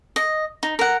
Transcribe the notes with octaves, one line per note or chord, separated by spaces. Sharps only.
D#5
D#4
A#4 F#5